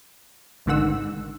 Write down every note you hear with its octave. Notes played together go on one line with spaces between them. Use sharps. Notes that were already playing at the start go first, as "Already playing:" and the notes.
A1 G#2 D3 D#3 F#5 E6